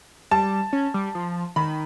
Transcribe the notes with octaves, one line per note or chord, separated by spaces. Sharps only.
G3 A5
C#4
G3
F3
D#3 B5